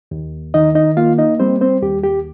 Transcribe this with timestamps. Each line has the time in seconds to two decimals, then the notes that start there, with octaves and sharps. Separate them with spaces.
0.11 D#2
0.54 D#3 D#4 D#5
0.75 D#4 D#5
0.97 A#3 F4 F5
1.18 D#4 D#5
1.40 G3 C4 C5
1.61 C4 C5
1.82 D#2 G4
2.03 G4